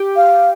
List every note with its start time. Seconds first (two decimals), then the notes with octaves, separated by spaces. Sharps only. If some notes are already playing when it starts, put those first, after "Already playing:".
Already playing: G4
0.16 F5